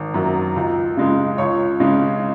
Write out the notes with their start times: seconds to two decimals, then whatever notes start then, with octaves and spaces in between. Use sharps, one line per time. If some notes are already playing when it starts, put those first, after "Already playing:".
Already playing: G#1
0.14 F#2 F#3
0.56 C#2
0.97 C#3 G#3
1.38 C#2 C#5
1.80 C#3 G#3